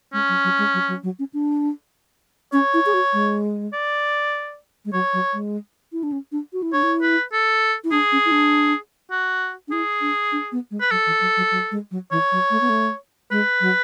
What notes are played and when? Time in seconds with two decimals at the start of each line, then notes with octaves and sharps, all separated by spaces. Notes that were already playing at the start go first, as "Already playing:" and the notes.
0.13 G#3 C#4
0.29 F#3
0.44 F#3
0.58 G#3
0.74 F#3
0.88 F#3
1.03 F#3
1.19 C#4
1.33 D4
2.53 C#4 C#5
2.74 E4
2.86 G#4
2.94 F#4
3.13 G#3
3.73 D5
4.85 G#3
4.93 F#3 C#5
5.13 F#3
5.33 G#3
5.92 E4
6.03 D4
6.12 C#4
6.32 D4
6.53 F#4
6.62 E4
6.73 D4 C#5
6.83 E4
7.02 B4
7.33 A4
7.84 E4
7.92 D4 G#4
8.12 C#4
8.25 E4
8.31 D4
9.11 F#4
9.68 D4
9.71 E4 G#4
10.01 D4
10.32 D4
10.52 B3
10.71 G#3
10.81 B4
10.91 F#3 A4
11.06 E3
11.21 F#3
11.37 F#3
11.51 F#3
11.71 G#3
11.91 F#3
12.11 E3 C#5
12.32 F#3
12.50 A3
12.61 B3
12.69 A3
13.31 G#3 B4
13.61 F#3